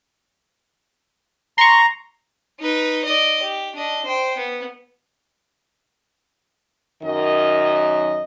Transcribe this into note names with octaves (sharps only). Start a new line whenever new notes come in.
A#5 C6 C#6
D#4 B4
D5 D#5
G4
D4 D#5
C5 G5
B3
F#2 D#3 F#3 D#5